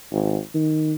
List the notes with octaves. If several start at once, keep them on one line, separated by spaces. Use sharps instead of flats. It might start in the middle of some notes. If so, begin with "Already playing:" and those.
G#1
D#3